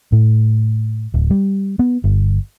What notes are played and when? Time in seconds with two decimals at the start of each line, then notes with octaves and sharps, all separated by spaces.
0.12 A2
1.14 D1
1.30 G3
1.79 B3
2.04 G1